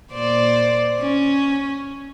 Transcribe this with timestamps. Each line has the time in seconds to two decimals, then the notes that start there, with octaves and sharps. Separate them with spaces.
0.13 A#2 C5 D5
0.99 C#4